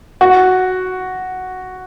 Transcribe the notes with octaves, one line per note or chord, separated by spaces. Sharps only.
F#4